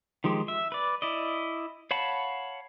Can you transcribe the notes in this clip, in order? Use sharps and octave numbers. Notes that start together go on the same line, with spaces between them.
D#3 F3 G#3 G4
E5
B4 D5
E4 D5 D#5
C#5 F5 F#5 A5 B5